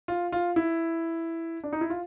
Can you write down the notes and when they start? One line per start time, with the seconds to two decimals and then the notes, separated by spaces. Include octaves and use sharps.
0.08 F4
0.32 F4
0.56 E4
1.63 D4
1.73 D#4
1.81 E4
1.90 F4